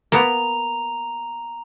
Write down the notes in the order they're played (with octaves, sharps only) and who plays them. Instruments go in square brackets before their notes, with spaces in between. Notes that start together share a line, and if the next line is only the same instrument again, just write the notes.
[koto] A#3 B3 [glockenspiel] A#5 F7